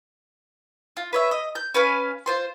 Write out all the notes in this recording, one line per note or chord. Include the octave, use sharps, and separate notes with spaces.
F4
B4 C#5 E5
D#5
G6
C#4 B4 F5 G#5
F4 C5 C6